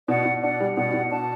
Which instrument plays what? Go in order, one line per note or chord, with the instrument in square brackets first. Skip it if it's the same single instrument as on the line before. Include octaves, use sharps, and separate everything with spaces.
[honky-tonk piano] B2 [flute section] D5 F#5
[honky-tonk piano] B2
[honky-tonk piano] D4 [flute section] D5 F#5
[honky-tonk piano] G3
[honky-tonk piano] B2 [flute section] D5 F#5
[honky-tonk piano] B2
[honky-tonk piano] D4 [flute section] F#5 A5